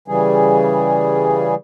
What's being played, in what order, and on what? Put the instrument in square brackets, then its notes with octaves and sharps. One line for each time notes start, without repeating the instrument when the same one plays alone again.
[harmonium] C#3 E3 G3 G#4